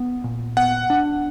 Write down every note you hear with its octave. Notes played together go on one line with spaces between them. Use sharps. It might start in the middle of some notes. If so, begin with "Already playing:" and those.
Already playing: B3
A#2
B3 F#5
D4